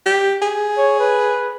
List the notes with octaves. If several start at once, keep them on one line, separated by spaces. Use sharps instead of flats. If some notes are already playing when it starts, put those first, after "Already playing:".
G4
G#4
C#5
B4